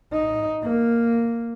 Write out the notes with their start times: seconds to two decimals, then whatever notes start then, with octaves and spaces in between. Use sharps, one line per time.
0.13 D#4
0.63 A#3